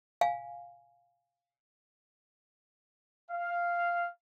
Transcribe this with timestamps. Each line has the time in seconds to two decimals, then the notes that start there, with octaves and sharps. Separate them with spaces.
0.21 F5 G#5
3.31 F5